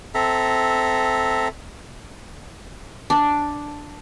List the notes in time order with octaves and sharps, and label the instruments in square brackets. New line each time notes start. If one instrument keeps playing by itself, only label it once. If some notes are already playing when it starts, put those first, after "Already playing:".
[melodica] C4 A4 E5 A#5
[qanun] D4